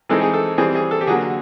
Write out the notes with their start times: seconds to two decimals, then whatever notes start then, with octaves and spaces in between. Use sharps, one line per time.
0.09 E3 G#3 C4 D#4 A4
0.21 G#4
0.33 A4
0.58 E3 G3 C4 G#4
0.75 G#4
0.91 A4
1.01 G4
1.07 D3 F#3 A#3 G#4